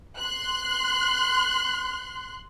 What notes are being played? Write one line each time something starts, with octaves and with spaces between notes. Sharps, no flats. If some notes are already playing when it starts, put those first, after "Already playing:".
C6 F#6